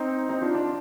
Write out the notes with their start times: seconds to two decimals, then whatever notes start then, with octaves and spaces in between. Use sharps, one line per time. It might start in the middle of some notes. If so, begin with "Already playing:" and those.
Already playing: C4 D#4
0.29 C4 D#4
0.41 D4 F4
0.54 D4 F4